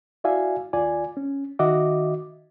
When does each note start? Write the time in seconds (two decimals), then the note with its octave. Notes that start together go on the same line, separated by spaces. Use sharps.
0.24 E4 F#4 D5 E5 F5 G#5
0.73 D#2 F4 D5 G#5
1.17 C#4
1.59 D#3 F#4 D#5 E5 D6